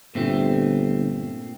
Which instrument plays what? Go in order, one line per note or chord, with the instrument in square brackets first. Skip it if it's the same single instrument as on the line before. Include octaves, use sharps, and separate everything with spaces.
[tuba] G1 [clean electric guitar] A#2 A3 C4